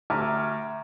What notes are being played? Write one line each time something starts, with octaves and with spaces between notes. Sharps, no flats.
D2 E5 A#5 D6 F6